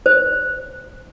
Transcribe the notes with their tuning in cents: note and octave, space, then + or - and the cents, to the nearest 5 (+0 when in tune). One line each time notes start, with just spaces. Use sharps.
C5 -15